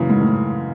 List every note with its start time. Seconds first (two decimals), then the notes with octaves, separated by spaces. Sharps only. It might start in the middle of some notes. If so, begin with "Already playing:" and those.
Already playing: F#2 A#2 C#3 E3
0.10 G#2
0.21 A2